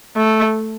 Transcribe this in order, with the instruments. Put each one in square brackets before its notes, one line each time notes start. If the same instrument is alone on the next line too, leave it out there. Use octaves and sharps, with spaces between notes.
[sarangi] A3